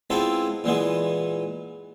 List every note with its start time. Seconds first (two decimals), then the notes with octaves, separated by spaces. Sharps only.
0.10 G#3 B3 C4 E4 F4 A4
0.64 A#2 E3 G#3 B3